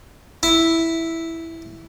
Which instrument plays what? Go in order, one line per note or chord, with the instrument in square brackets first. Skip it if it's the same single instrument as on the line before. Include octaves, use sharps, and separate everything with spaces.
[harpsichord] E4